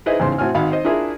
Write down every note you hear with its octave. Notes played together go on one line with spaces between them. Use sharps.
D#4 E4 G#4 B4 C5 D#5
A1 E2 G#2 C#3 C5 C6
A2 C4 F#4 G#5 F6
G#1 D#3 F#4 F5 F#5 B5
C5 D#5
D4 E4 F4 G#4 A#4